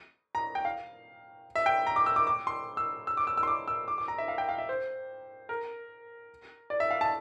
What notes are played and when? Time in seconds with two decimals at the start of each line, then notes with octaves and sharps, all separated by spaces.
0.35 A#5
0.55 G5
0.65 F5
1.55 E5
1.66 G5
1.87 A#5
1.96 D6
2.06 E6
2.16 D6
2.27 D6
2.47 C6
2.77 E6
3.07 E6
3.17 D6
3.27 E6
3.37 E6
3.43 C6
3.48 D6
3.68 E6
3.88 D6
3.98 D6
4.08 A#5
4.18 E5
4.28 F5
4.38 G5
4.49 F5
4.58 E5
4.69 C5
5.49 A#4
6.70 D5
6.80 E5
6.91 F5
7.01 A5